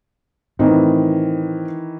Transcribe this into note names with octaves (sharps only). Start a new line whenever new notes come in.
A2 D#3 E3 C4 D#4